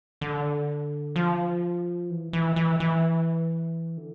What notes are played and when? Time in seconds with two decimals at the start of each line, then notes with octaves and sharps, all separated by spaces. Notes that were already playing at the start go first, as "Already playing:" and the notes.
0.21 D3
1.16 F3
2.10 E3
2.33 E3
2.56 E3
2.80 E3
3.97 D3